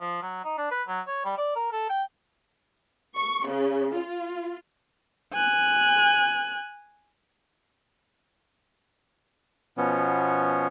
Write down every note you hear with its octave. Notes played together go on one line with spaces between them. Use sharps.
F3
F#3
D#4
D4
B4
F#3
C#5
G3
D5
A#4
A4
G5
C#6
C#3
F4
G#5 F#6
B2 F3 B3 C#4